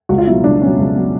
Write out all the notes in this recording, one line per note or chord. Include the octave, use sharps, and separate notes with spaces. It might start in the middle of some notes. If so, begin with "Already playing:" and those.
C#2 F#4
F4
B2 F#3 E4
C#2 D4
B2 F#3 C#4
C#2
B2 F#3